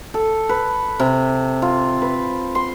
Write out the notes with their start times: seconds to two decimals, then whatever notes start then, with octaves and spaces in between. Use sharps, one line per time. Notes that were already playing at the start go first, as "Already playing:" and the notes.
0.14 A4
0.49 B4
1.00 C3
1.62 F4
2.02 B4
2.55 C6